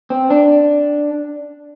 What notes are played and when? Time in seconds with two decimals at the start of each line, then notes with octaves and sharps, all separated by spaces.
0.10 C4
0.30 D4